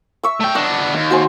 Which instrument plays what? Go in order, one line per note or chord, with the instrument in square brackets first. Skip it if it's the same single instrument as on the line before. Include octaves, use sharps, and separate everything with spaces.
[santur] E5 C#6 E6
[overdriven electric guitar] A3 G5
[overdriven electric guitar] B3 D4 [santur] D#5 C#6
[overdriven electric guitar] D#2
[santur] F#4 C5 G#5